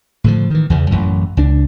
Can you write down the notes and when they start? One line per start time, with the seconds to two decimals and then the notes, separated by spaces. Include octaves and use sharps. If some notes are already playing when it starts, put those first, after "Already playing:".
0.24 A2 D3 F3
0.50 D#3 E3
0.70 E2 C#3 E3
0.91 A1 F#2 E3
1.37 C#2 D4